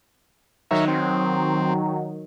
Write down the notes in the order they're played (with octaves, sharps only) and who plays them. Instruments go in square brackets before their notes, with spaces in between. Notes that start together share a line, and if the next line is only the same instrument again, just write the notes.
[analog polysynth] D#3 F#3 D#4 [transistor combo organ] A#4 C#5 E5
[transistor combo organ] C4